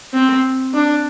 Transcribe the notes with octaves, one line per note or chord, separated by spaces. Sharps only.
C4
D4